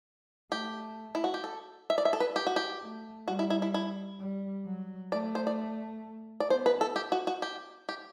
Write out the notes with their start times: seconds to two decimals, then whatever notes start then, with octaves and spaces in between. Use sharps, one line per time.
0.51 A3 G4
1.15 E4
1.24 F#4
1.34 G4
1.44 A4
1.90 E5
1.98 D5
2.05 E5
2.13 A4
2.20 B4
2.36 G4
2.47 F#4
2.56 G4
2.82 A3
3.28 G3 F#4
3.39 E4
3.50 E4
3.62 E4
3.74 E4
4.20 G3
4.66 F#3
5.12 A3 D5
5.35 C5
5.47 D5
6.40 D5
6.50 B3 C5
6.66 B4
6.81 A4
6.96 G4
7.12 F#4
7.27 F#4
7.42 G4
7.89 G4